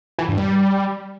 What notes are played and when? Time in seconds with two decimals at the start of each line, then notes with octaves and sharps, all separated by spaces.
0.19 E3
0.28 G2
0.38 G3